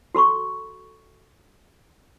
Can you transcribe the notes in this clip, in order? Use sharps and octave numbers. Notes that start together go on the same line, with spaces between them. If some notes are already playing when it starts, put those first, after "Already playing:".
F#4 A4 B5 C#6